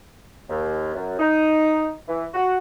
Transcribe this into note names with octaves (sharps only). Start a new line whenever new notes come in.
D#2
F#2
D#4
E3
F#4